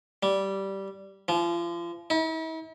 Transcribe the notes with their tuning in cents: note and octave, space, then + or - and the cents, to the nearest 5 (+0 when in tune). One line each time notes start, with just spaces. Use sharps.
G3 -10
F3 -35
E4 -45